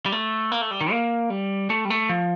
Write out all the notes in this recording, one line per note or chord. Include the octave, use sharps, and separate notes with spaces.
G3
A3
A#3
A3
G3
D#3
A#3
G3
A3
G3
A3
F3